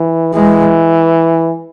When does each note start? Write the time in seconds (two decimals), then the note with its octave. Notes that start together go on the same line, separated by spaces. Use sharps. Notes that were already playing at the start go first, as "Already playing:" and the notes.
Already playing: E3
0.34 E3 G#3